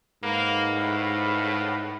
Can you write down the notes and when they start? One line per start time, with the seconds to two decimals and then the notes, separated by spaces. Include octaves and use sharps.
0.23 G#2 A#3 B4 F5 F#5
0.72 A2